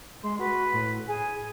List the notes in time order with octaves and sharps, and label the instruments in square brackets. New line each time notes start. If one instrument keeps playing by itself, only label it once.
[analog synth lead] G#3 [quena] C6
[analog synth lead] F#4 [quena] B4
[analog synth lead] A2
[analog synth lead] G#4 [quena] G#5